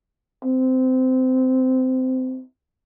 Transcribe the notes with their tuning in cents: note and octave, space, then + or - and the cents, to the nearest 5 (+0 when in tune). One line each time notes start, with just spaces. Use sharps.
C4 -20